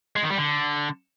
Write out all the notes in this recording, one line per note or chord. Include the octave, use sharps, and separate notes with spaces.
G#3
D#3
G3
D3